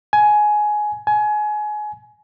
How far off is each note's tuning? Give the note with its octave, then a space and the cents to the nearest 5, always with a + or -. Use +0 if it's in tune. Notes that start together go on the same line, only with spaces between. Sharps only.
G#5 +15
G#5 +25